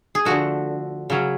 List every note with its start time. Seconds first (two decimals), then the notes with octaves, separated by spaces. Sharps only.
0.15 G#4
0.25 D3 F3 A3 F#4
1.10 C#3 F#3 C#4